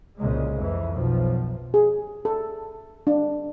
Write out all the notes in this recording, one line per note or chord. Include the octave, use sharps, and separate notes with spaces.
C2 A#2 C#3 G#3
F2 E3
B1 F3
G#4
A4
D4